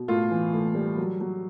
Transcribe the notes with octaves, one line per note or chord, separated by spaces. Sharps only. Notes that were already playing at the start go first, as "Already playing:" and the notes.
Already playing: B2
A2 F4
E3
A2
G3
F#3
F#3